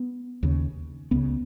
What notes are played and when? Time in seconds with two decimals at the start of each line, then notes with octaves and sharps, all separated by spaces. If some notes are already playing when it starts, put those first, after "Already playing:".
Already playing: B3
0.43 D#2 C#3
1.11 C#2 C#3 B3